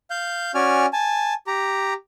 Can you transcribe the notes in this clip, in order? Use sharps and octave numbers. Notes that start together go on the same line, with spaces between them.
F5 G6
C#4 F#4 D5 G#5 F6
G#5 A5
G4 A#5